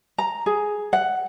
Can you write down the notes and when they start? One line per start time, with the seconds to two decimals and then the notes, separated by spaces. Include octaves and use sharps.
0.18 A#5
0.46 G#4
0.93 F#5